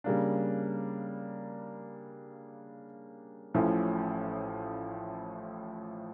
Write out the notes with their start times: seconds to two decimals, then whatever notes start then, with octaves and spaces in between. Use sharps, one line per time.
0.04 C#3 G3 A#3 D4
3.54 A1 A2 F3 C#4 E4